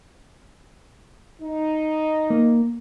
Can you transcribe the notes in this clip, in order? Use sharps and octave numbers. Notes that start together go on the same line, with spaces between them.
D#4
A#3